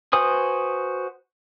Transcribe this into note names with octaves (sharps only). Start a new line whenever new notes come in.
F#4 B4 C5 G#5 D#6